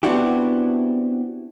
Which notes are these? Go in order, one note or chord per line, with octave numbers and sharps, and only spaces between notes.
B3 C4 D4 E4 F#4 G4